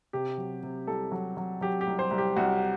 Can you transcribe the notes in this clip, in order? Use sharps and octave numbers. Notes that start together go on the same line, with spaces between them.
C3 G4
F#3
C3
C2 A4
F#3
F#3
F#3 G4
G4
C2
C5
C2
G4
C2 F#4